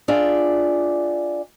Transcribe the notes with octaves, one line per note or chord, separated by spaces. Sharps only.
D4 F4 G#4 D5 E5